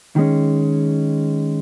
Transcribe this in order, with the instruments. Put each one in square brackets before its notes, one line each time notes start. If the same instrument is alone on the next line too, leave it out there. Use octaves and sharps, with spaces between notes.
[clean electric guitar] D#3 G#3 C#4